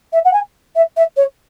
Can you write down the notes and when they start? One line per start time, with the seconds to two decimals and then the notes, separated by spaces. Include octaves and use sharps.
0.12 E5
0.24 F#5
0.33 G#5
0.75 E5
0.96 E5
1.16 C#5